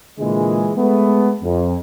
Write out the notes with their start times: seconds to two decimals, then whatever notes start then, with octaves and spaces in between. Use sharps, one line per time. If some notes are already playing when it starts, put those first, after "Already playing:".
0.18 A#2 D3 E3 G#3
0.76 G#3 A3 B3
1.43 F2